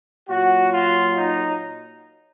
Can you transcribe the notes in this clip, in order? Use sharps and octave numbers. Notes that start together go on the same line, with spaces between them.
A#2 F#3 F#4
F4
D#4